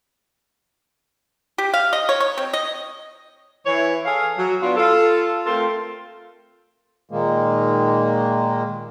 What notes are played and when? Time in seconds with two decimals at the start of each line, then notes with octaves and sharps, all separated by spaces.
1.58 G4
1.74 F5
1.93 D#5
2.09 C#5
2.20 C#5
2.38 C4
2.53 D#5
3.65 E3 C#5
4.05 G#4 A4 F5
4.37 F#3
4.61 B3 D4 F4 F#4
4.77 F4 A4
5.45 A3 C4 F4 A4 A#4
7.11 A#2 D#3 G#3 A#3